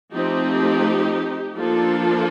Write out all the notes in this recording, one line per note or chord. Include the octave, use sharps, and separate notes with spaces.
F3 A3 C4 D#4 G4
F3 A#3 D4 F4 A4